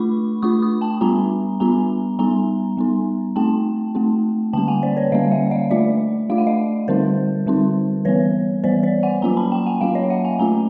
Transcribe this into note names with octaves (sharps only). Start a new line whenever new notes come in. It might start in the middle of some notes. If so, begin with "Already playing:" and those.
Already playing: A3 D4 F4 B5 C#6
A3 D4 F4 C#6 D#6
C#6 D#6
G5 A5
G3 B3 D4 F4 G#5 A#5
G3 B3 D4 F4 G#5 A#5
G3 B3 D#4 G#5 A#5
G3 B3 D#4
A3 C4 D#4 G5 A5
A3 C4 D#4
D3 G3 A#3 C#4 G5 A5
F#5 G#5
C5 D5
B4 C#5
D3 G3 A#3 C#4 D#5 F5
E5 F#5
E5
D#5 F5
A3 D4 F4 D5 E5
A3 D4 F4 F5
F#5
D#5 F5
D3 G3 C4 D#4 A#4 C5
D3 G3 C4 D#4
E3 G3 B3 B4 C#5
E3 G3 B3 C5 D5
C5 D5
F#5 G#5
F#3 A#3 C#4 F4 G#5 A#5
A5 B5
G5 A5
F#5 G#5
F#3 A#3 C#4 F4 F5 G5
C#5 D#5
E5 F#5
F#5 G#5
A3 C#4 F4 G#5 A#5